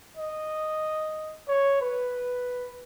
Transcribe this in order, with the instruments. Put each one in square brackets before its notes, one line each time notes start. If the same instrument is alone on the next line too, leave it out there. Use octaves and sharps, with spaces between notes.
[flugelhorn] D#5
C#5
B4